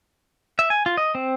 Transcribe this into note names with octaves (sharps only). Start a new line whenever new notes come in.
E5
G#5
F4
D#5
C4